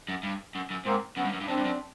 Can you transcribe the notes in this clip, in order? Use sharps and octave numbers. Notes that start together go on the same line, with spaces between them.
F#2
G2
F#2
F#2
G#2 A#3 C4
F#2 B3 C#4
G2
F#2
G2
F#2 C4 D4
G2
F#2